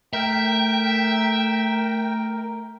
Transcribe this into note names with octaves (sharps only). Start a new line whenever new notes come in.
A3 A#4 E5 G5